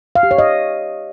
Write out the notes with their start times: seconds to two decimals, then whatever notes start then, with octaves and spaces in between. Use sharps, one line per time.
0.15 F5
0.23 G4
0.31 C#5
0.38 D#5